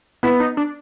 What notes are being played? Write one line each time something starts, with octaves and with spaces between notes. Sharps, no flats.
B3 E4
D#4
D4